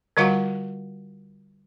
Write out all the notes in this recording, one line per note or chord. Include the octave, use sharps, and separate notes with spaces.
D3 G3 F4 F#4 F5 F#5